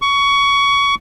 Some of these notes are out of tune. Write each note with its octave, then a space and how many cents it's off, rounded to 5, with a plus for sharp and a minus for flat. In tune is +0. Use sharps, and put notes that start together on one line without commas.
C#6 +20